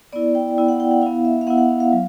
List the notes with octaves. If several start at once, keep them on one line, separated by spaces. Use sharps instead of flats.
B3 E4 D5
G5
B3 E4
F#5
G5
F#5
B3 E4 F5
E5
F5
B3 E4 F#5
F#5
F5
F5
F#3